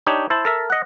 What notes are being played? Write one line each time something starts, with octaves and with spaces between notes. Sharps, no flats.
D4 D#4 G4 C#5
E4 C5 A5
A4 A#4 E5
D#5 F#5